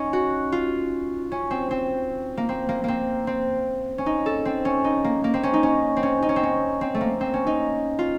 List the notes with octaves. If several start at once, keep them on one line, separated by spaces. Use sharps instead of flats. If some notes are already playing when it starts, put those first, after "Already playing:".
Already playing: C#4 D#4
F#4
F4
C#4
C4
C4
A#3
C4
A#3
A#3 C4
C4
C#4
D#4
A4
C4
C#4
D#4
A#3
A#3
C4
C#4
D#4
C#4
C4
C#4
D#4
C#4
C4
C#4
C4
A3
A#3
C4
C#4
D#4
F4